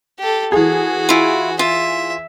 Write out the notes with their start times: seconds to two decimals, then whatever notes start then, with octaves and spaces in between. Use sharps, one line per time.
0.19 G4 A4
0.52 E3 F#4 G#4
1.09 E4 F4
1.59 F4 E5